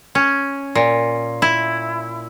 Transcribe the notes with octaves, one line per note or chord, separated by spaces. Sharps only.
C#4
A#2
E4